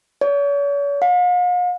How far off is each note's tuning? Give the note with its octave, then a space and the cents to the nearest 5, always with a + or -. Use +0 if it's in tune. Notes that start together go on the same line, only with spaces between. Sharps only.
C#5 +40
F5 +45